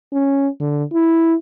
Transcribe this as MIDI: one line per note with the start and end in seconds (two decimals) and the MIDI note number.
0.13 0.48 61
0.60 0.84 50
0.93 1.34 64